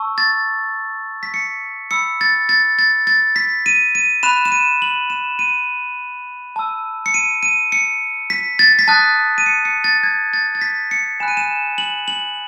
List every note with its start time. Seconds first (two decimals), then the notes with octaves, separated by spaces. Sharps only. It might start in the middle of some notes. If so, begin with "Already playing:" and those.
Already playing: A5 C#6 E6
0.18 A6
1.23 B6
1.34 C#7
1.91 B5 E6 C#7
2.21 A6
2.49 A6
2.79 A6
3.07 A6
3.36 B6
3.66 D#7
3.95 D#7
4.23 B5 F#6 E7
4.45 E7
4.52 D#7
4.82 F#7
5.10 E7
5.39 D#7
6.56 A5 E6
7.06 C#7
7.14 D#7
7.43 D#7
7.72 C#7
8.30 B6
8.59 A6
8.79 B6
8.88 A5 D#6 F#6 A6
9.38 D#7
9.46 C#7
9.65 C#7
9.84 A6
10.03 G#6
10.34 A6
10.55 A6
10.61 B6
10.91 C#7
11.20 G#5 B5 F#6 E7
11.28 D#7
11.37 E7
11.78 F#7
12.08 F#7